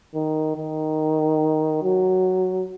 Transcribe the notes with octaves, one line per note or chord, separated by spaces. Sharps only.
D#3
D#3
F#3